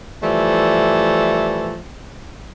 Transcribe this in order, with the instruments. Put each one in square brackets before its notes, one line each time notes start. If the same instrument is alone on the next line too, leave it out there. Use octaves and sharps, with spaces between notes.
[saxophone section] E3 F3 G3 A3